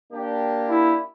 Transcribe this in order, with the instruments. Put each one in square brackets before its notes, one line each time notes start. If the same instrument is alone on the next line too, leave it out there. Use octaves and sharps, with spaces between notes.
[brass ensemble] A#3 D4 G4
[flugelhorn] E4